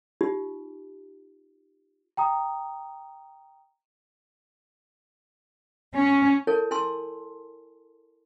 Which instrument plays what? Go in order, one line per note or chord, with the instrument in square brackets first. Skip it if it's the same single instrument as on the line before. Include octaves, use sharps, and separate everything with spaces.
[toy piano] D#4 F4 G4
[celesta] G5 A#5 D#6
[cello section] C#4
[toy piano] E4 A4 A#4 C#5 A5
E4 G#5 A5 C6 E6